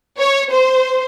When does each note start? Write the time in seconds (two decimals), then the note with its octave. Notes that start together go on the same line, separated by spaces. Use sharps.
0.20 C#5
0.50 C5